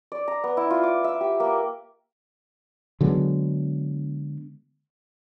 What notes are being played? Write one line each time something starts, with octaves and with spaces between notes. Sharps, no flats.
D5
A#5
B3
E4
F4
D6
E5
G4
A#3
D3 F#3 G#3 B3